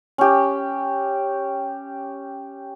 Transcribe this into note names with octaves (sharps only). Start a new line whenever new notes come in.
C#4 G4